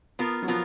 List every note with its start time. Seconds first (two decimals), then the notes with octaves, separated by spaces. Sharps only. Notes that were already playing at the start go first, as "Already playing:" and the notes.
0.19 B3 F4 A#4
0.42 F#3
0.48 F3 B3 F4 A#4